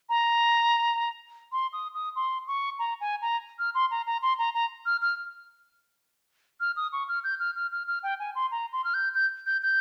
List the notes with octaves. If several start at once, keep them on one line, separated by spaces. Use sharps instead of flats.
A#5
C6
D#6
D#6
C6
C#6
A#5
G#5
A#5
F6
C6
A#5
A#5
C6
A#5
A#5
F6
F6
F6
D#6
C#6
F6
G6
F6
F6
F6
F6
G5
G#5
C6
A#5
C6
F6
G6
G6
G6
G6